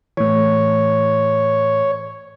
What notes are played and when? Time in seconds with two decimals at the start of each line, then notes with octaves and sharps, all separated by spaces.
0.17 A2 E3 C#5